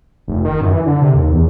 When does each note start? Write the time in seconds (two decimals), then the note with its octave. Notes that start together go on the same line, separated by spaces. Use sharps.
0.28 F1
0.45 D#3
0.61 F#2
0.73 E3
0.86 D3
1.01 C3
1.14 D#2
1.32 E2